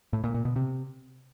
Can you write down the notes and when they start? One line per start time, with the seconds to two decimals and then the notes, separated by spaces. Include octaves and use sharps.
0.13 A2
0.24 A#2
0.34 A#2
0.45 B2
0.56 C3